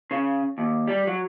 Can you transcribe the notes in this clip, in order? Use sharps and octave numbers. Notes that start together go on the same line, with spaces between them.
C#3
D#2
G3
F#3